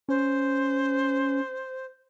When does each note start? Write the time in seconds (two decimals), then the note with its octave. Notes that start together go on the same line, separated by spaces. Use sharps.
0.09 C#4 C5